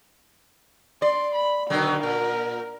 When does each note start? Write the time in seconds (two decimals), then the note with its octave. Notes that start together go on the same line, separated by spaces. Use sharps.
1.02 D5 C6
1.35 B5
1.70 B2 D3 D#3 F#3
2.03 A#2 A#4